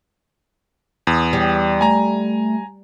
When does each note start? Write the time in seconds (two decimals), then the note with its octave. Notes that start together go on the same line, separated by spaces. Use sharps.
1.07 E2 D#6
1.33 G3
1.81 A3 G#5 A#5